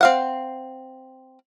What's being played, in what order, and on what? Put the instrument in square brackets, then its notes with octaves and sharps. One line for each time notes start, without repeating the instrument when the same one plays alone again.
[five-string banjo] C4 F5 F#5